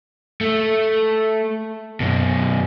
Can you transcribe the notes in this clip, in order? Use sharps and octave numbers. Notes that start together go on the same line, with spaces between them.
A3
F#2 B2